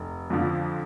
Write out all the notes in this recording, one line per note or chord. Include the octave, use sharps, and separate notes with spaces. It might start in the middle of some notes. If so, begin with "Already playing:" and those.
Already playing: F1
F2 D3 F3